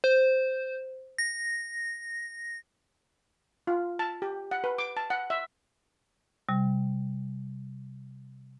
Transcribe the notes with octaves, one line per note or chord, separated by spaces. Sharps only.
C5
A#6
F4
A5
G4
F#5
B4
D6
A5
F#5
E5
C3 G3